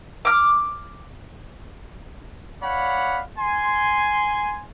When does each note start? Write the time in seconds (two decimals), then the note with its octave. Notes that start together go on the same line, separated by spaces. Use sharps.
0.25 D6 F6
2.63 C#5 D5 F5 F#5 B5
3.38 G#5 C6